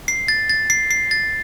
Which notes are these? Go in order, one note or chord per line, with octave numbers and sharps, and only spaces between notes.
C7
A6
A6
C7
C7
A6